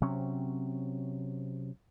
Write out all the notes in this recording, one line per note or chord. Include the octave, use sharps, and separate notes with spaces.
C3 F#3 C4 C#4